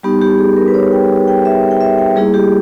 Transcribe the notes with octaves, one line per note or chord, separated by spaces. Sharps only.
G3 B3 D#4 G4
G4
G#4
A#4
B4
C#5
G5
G5
E5
G5
E5
G5
G3 A#3 E4 G#4
G4